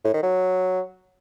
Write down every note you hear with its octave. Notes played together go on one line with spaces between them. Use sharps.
A2
D#3
F#3